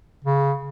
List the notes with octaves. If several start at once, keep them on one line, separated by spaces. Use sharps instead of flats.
C#3